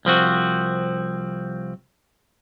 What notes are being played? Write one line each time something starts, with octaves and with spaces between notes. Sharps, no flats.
C2 F3 C4 F#4